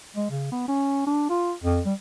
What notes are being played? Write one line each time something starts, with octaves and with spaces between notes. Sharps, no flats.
G#3
C#3
B3
C#4
D4
F4
F2
G3